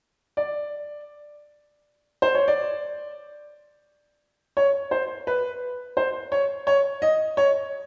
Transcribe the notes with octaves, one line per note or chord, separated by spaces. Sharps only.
D5
C5
C#5
D5
C#5
C5
B4
C5
C#5
C#5
D#5
C#5